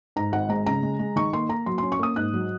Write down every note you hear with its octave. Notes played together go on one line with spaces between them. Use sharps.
G#2 A#5
G#1 F#5
G#3 A#5
C#3 A#5
G#3
G#3
D#3 C#6
A#3 C6
A#3 A#5
F#3 C6
C#4 C6
C#6
A#3 D#6
G#2 F#6
F#3